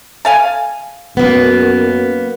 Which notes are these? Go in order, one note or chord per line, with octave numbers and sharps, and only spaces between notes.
A4 F5 G#5
F#2 A#3 B3